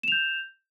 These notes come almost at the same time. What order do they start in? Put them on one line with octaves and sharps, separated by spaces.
E7 F7 G6